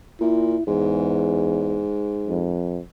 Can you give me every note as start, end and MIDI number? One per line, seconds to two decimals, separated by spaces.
0.21 0.56 46
0.21 0.64 64
0.67 1.88 40
0.67 2.55 44
2.27 2.81 41